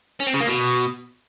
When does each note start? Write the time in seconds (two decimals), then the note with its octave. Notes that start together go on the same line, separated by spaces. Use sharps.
0.20 C#4
0.27 C4
0.34 C#3
0.41 A#3
0.47 B2